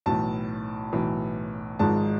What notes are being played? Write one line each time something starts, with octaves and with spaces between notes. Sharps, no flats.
B1 A2 E3 A5
B1 A2 E3
G#1 G#2 F3 G#3 A5